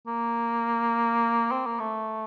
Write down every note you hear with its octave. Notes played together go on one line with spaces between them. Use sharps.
A#3
C4
A#3
A3